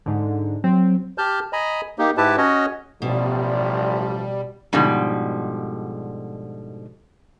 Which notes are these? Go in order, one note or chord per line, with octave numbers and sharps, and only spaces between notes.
G#2 D3
F#3 C4
G4 A5 F6 G6
D#5 G#5 A#5 B5
A#3 D#4 G4
G#2 E4 G4 B4 A5
C#4 F#4 C#5 D#5
A1 B2 F3 G3
G#2 B2 D3 F3 G3